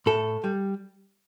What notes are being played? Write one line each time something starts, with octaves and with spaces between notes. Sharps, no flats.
A2 A4
G3